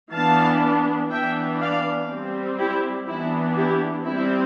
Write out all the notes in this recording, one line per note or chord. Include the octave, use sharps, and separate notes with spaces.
E3 B3 D4 F5 A5
E3 B3 D4 E5 G5
D5 F5
G3 C4
E4 G4
E3 B3 D4 E4
E4 G4
G3 C4 E4